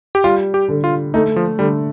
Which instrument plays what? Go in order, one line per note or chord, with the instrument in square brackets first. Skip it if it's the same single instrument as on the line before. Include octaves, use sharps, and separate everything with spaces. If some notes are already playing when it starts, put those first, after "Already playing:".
[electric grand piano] G4
[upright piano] G3 [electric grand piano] F4
[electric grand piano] G4
[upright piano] D3
[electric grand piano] F4
[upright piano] A3 [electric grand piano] D#4
[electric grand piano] F3
[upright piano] D3 [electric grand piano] G3